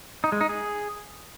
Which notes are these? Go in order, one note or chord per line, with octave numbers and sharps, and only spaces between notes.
D#4
G#3
D#4
G#4